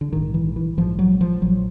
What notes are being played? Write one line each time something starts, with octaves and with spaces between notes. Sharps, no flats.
D3
A#1 G#2 D#3
E3
E3
A#1 G#2 F3
F#3
F3
A#1 F#3